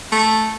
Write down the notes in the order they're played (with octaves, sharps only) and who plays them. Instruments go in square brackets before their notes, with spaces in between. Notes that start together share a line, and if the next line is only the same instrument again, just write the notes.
[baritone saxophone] A3